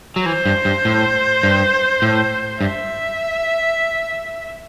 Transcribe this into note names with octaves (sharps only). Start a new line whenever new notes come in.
F#3
E3 C5
G2
G2
A2
G2
A2
G2 E5